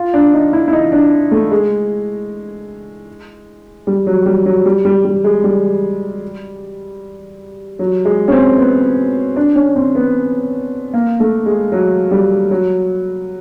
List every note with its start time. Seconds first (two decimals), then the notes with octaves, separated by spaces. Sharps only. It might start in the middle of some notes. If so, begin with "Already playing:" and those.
Already playing: F4
0.14 D4
0.33 D#4
0.53 E4
0.68 E4
0.73 D#4
0.92 D4
1.31 A3
1.51 G#3
3.87 G3
4.07 F#3
4.26 G3
4.46 F#3
4.66 G3
4.85 G3
5.04 G3
5.24 G#3
5.44 G3
7.79 F#3
8.05 G#3
8.28 C#4
8.32 C4
8.58 B3
9.36 D4
9.56 C#4
9.76 C4
9.95 B3
10.93 A#3
11.20 A3
11.46 G#3
11.72 F#3
12.11 G3
12.51 F#3